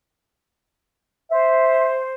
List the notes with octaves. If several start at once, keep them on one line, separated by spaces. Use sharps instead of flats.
C5 E5